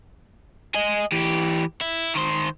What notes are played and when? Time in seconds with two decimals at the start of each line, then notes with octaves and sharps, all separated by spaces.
0.75 G#4 D#5
1.12 E3 G4
1.81 E4
2.15 D#3 C5